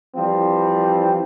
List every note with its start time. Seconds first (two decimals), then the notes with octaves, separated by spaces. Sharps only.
0.16 E3 F3 G3 C4